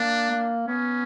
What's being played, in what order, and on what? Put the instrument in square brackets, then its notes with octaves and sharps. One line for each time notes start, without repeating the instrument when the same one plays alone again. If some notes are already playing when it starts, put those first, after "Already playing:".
Already playing: [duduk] A#3 [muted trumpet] D4
[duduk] A#3
[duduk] B3 [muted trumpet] C#4